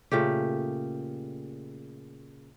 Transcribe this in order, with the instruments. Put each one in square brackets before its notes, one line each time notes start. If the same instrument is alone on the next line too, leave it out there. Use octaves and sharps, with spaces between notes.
[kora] A#2 C#3 A3 G4